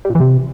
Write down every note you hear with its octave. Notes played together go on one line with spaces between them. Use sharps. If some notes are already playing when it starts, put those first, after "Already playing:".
G3
A#2
E3
C3